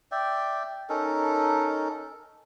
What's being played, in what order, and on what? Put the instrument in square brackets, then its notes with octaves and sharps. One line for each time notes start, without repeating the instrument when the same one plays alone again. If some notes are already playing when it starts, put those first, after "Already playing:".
[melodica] D5 E5 G5
C#4 D#4 A4 A#4